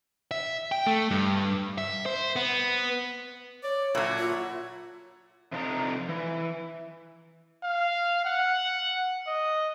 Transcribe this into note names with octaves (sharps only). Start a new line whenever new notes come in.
E5
G5
A3
G2
E5
C5
B3
C#5 D5
A#2 F#3 E4 F#4 A4
F4
C3 F3 D4 D#4 A4 A#5
E3
F5
F#5
D#5